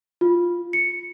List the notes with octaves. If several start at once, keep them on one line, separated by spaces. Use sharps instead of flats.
F4
C#7